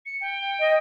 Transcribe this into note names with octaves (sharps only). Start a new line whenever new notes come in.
C#7
G5
D#5